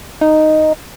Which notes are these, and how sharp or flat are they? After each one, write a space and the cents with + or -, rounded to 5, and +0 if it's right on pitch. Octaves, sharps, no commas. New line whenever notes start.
D#4 -5